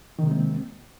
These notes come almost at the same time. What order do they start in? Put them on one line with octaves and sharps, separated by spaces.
D#3 C3 G#3 C4 A#3